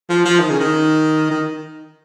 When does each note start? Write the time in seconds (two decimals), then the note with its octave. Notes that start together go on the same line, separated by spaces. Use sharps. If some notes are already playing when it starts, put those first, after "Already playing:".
0.09 F3
0.25 F3
0.40 D#3
0.50 C#3
0.59 D#3
1.31 D#3